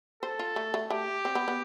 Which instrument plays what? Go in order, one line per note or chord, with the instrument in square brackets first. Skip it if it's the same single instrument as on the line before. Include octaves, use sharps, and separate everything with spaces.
[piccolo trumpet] A4 [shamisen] C5
[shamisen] F4
A3
A3
[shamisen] A3 [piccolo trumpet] G4
[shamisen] C4
B3
B3